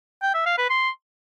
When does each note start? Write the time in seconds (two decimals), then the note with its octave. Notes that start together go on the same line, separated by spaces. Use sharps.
0.22 G5
0.34 E5
0.46 F5
0.58 B4
0.70 C6